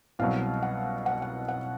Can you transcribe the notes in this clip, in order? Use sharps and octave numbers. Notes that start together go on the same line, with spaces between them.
C2 B2 F#3 F5
F#5
F#5
F#5
F#5